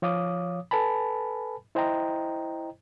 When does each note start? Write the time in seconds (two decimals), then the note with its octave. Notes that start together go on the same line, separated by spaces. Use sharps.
0.02 F3 C#5 F5 D6 D#6
0.71 A4 B4 G#5 A5 B5
1.75 E4 C5 D#5 G5 A#5